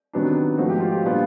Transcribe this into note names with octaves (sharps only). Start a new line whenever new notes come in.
C3 D#3 F#3 B3 D4
G#2 F3 A3 F#4
G4
F4
G4
A#2 G3 B3 D4 F4